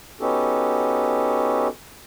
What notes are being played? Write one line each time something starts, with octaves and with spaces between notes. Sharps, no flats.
B3 C#4 D#4 F#4 G4 A4